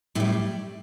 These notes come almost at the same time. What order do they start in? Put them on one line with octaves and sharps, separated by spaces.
A2 E4 G3